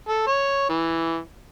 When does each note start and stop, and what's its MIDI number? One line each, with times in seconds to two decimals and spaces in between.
0.08 0.22 69
0.27 0.65 73
0.69 1.19 52